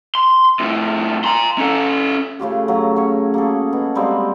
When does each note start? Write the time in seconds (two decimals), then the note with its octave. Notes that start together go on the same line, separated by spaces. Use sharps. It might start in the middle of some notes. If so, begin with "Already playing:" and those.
0.15 C6
0.60 F2 A2
1.24 A#5 C6
1.58 C#4 A4
2.39 C#3 A3 F4 G4
2.68 F#3
2.96 C#4 C#5
3.34 A#3 G#4 A4
3.73 B2
3.95 G3 G#3 A#3 C4